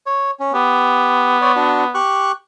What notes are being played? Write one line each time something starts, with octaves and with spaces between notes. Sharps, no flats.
C#5
C#4
B3 G4
C#5 D5
D4 F#4
G4 C#6 F#6